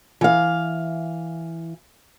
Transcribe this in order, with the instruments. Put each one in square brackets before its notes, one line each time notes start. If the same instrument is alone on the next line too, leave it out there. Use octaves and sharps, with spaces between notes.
[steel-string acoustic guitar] E3 F5